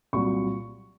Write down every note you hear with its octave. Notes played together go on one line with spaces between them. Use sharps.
C2 A#2 F#3 C#6